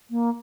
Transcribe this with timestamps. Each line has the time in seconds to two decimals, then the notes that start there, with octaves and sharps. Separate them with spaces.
0.10 A#3